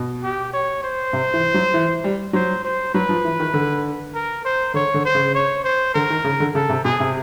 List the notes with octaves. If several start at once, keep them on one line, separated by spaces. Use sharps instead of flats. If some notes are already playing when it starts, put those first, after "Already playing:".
Already playing: B2
G4
C#5
C5
C3
E3
F#3
E3
G3
F#3 C5
C5
F#3 B4
F3
E3
D#3
D3
A#4
C5
D3 C#5
D3
C5
C#3
C#5
C5
D3 A#4
D#3
C#3
D3
C#3 A4
C3
B2 G#4
C3